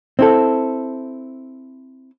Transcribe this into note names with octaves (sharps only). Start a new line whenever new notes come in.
C4 E4 A4